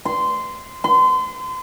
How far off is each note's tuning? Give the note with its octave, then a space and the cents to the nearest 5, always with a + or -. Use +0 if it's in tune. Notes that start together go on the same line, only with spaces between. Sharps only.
C6 -15
C6 -35